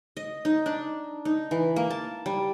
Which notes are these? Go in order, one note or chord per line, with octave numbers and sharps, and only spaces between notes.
D#5
D#4
D4
D#4
E3
A#3
A5
G3